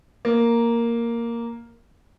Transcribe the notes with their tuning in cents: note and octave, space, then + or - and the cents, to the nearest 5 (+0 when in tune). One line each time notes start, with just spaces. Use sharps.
A#3 +0